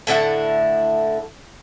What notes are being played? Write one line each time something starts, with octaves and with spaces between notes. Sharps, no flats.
A2 D3 E4 F#5